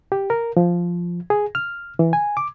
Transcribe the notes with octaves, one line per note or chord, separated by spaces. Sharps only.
G4
A#4
F3
G#4
F6
E3
G#5
D6